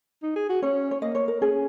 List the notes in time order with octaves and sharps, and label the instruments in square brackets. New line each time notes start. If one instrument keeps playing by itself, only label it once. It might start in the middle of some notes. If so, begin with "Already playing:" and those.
[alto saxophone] D#4
G#4
F#4
[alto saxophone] C#4 [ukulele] C#5
[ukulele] C#5
[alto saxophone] A#3 [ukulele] D#5
[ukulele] C#5
A#4
[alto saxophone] C#4 [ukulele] G#4